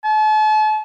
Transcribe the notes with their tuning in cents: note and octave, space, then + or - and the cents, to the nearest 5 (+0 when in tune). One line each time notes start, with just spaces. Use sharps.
A5 -40